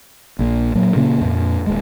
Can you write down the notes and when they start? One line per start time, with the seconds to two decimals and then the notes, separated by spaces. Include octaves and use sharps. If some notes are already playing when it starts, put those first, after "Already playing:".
0.39 A#1 A#2
0.75 A#2 F#3
0.96 A#2 C#3 A#3 C#4
1.21 F2 A#2
1.67 D#1 G#3